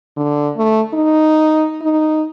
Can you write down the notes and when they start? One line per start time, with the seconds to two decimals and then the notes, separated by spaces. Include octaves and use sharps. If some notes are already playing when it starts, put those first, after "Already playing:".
0.17 D3
0.57 A3
0.94 D#4
1.82 D#4